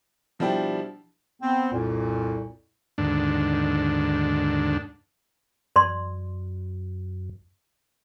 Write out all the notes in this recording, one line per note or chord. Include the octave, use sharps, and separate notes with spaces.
B2 F3 G3 D4 E4 G5
B3 C4
C2 F2 A#2
D#2 G#2 D3 D4
F#2 D5 C6